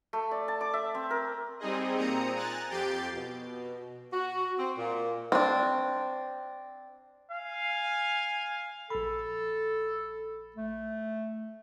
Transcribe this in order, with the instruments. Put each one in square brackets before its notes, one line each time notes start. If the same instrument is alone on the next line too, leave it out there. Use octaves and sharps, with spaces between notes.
[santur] A3
D5
A5
D6
E5
C4
A#4
[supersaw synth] G3 C4 D#4 G#4 D#5
A#2 C4 A#5 D#6 C#7
G#5 A#5 F#6 A6
F2 G4 G6 A6 C7 D7
[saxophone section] B2
F#4
C4
A#2
[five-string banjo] C4 D4
[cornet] F5 [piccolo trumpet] G#5
[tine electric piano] A#1 B5 [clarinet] A4
[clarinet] A3